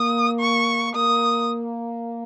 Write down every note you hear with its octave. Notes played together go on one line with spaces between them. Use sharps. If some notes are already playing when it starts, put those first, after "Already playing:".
Already playing: A#3 D#6
C#6
A#3 D#6